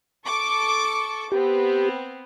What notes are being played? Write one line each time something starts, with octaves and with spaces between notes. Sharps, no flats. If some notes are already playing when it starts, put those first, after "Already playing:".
A4 C#6 D6
B3 C4 G4